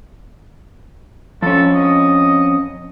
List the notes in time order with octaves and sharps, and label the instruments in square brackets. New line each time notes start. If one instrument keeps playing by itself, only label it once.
[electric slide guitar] F2 C#4 [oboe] A4
[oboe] D#5